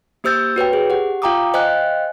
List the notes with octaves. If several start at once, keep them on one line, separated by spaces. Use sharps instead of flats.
A#3 G4 C5 E6 G6 A6
F#4 B4 C#5 G5
G#4
G4 F#5
F4 F5 G5 A#5 D6 D#6
C5 D#5 F5 G5 G#5 F#6